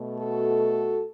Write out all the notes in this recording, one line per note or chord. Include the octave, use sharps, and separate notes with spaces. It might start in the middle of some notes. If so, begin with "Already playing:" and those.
Already playing: B2 A3
F#4 A4